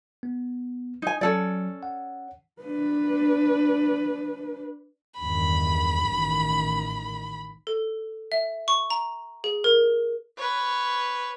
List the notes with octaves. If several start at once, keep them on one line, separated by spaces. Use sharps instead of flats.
B3
D#4 G#5
F#3 C#4 A4 D5
F#5
D4 B4
E2 G2 D#3 B5
A1 D#3
A4
E5
C#6
A#5
G#4
A#4
B4 C#5